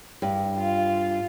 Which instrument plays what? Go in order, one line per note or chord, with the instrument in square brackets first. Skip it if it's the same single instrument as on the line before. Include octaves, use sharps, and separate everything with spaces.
[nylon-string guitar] G2
[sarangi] F4